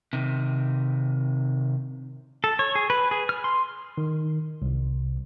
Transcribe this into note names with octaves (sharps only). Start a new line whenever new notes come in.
C3 D#3
A4
C#5
G#4
B4
G#4
F6
C6
D#3
C2